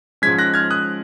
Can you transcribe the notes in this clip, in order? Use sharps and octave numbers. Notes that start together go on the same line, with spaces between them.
G#2 F3 G#3 C#4 G#6 B6
F#6 A#6
F6 G#6
D#6 F#6